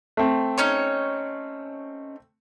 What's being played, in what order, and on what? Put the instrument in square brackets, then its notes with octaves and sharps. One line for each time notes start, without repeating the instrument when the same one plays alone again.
[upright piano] A3 C4
[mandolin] C#4 D#4 C#5